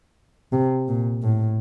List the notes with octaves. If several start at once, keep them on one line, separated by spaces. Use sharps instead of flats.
C3
A#2
A2